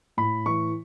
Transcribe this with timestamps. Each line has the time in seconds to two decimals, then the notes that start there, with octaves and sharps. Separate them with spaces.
0.17 A2 B5
0.46 E3 C#6